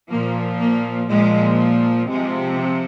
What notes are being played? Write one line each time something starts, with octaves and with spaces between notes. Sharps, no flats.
A#2 F3 A#3
A#3
A#2 F3 G#3
C3 F3 G#3